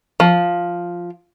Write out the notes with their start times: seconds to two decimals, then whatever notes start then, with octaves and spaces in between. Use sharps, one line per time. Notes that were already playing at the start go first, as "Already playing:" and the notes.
0.20 F3